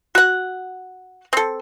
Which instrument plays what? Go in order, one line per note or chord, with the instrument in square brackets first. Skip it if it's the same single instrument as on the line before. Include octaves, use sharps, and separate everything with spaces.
[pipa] F#4 F#5
C4 A4